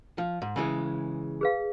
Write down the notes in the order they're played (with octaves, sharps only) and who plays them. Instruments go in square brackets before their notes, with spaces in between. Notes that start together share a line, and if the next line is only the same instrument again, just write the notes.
[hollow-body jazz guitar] F3
G#2
C#3 E3 G#3
[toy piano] G#4 B4 F5